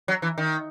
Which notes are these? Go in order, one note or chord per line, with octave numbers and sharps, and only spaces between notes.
F#3
E3
D#3